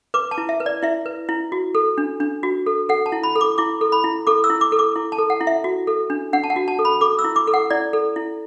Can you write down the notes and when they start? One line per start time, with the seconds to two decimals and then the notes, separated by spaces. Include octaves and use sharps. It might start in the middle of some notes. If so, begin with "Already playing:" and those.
0.14 B4 D6
0.31 A5
0.38 E4
0.49 E5
0.60 B4
0.66 D5
0.82 E4 E5
1.06 B4
1.29 E4
1.52 F#4
1.75 A4
1.98 D4
2.20 D4
2.43 F#4
2.66 A4
2.89 A4 F#5
3.06 A5
3.12 E4
3.23 B5
3.36 A4
3.41 D6
3.58 E4 D6
3.81 A4
3.92 B5
4.04 E4
4.27 A4 D6
4.44 E6
4.50 E4
4.61 D6
4.72 A4
4.79 D6
4.96 E4
5.12 A5
5.18 A4
5.30 F#5
5.41 E4
5.47 E5
5.64 F#4
5.87 A4
6.10 D4
6.33 D4 F#5
6.44 A5
6.50 F#5
6.56 F#4
6.68 A5
6.79 A4
6.85 B5
7.01 A4 D6
7.19 E6
7.24 E4
7.36 D6
7.47 A4
7.54 F#5
7.70 E4 D5
7.93 A4
8.16 E4